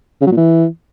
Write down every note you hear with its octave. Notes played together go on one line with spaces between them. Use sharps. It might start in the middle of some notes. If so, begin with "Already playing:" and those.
C#3
F#3
A#2
E3